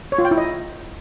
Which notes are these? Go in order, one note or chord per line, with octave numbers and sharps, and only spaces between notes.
C#5
F4
G5
E4
D#5